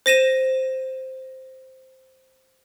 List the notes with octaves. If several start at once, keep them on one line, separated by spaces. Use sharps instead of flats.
C5 A#6 D#7 E7